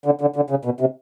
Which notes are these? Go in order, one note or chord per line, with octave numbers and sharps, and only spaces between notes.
D3
D3
D3
C#3
B2
C3